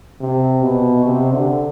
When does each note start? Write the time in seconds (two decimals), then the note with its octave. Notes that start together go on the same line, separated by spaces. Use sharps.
0.20 C3
0.63 B2
1.05 C3
1.33 D3